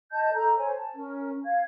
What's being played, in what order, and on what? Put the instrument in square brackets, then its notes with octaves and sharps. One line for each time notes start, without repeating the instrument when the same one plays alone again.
[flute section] D#5 A5 G6
A4 A#5
C5 C#5 G#5
A5
C#4 A#4
F5 G#6